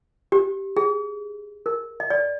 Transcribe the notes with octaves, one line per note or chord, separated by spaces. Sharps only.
G4
G#4
A#4
D#5
D5